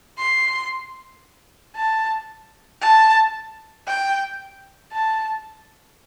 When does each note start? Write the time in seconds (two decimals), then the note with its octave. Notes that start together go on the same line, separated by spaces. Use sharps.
0.18 C6
1.76 A5
2.82 A5
3.87 G5
4.93 A5